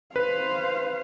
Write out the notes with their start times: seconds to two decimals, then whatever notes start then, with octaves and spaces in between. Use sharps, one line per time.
0.16 B4 C5 F5